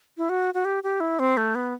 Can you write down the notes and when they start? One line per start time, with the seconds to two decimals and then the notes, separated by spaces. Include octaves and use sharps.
0.18 E4
0.29 F#4
0.54 F#4
0.65 G4
0.84 G4
1.00 E4
1.19 C4
1.37 A3
1.55 B3